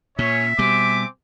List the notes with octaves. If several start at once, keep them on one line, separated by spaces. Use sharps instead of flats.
A#2 C#4 C#5 E5
B2 G3 C4 G#5 D6